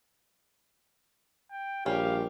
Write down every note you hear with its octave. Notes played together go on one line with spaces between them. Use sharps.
G5
A#1 G3 C#4 G4 F5